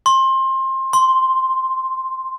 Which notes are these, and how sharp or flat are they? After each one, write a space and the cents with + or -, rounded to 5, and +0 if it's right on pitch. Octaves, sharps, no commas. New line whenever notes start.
C6 +25
C6 +0